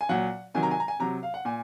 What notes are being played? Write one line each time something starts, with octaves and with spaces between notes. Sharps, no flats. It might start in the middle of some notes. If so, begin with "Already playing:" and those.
G#5
A#2 F#3 F#5
C3 D#3 F#3 G#5
A#5
G#5
A#5
G#5
C3 F#3 A#5
F5
F#5
A#2 G#5